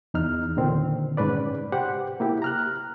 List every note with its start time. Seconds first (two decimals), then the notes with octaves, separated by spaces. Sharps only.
0.14 E2 D#4 F6
0.57 A#2 D3 D#3 C4
1.17 G#2 C#4 B4 D5
1.72 G4 C5 F#5
2.20 A#3 E4 G4
2.42 A#5 F6 F#6